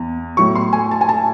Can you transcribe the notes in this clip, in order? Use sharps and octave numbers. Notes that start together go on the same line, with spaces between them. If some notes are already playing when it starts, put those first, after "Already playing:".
Already playing: E2
A2 F#3 C#6
C6
G#5
A5
G#5
A5